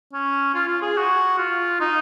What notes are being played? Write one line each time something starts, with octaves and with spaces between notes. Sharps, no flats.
C#4
F4
F4
G#4
F#4
F4
D#4